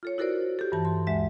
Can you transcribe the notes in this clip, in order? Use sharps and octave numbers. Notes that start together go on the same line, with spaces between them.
F4 A4 C#5
E4 F#4 A4 A#4 C5 D5
G4 A4
G2 E3 A5
C6
D2 G#3 E5